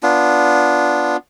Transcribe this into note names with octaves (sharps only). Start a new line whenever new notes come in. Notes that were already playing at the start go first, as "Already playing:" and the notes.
B3 D4 F4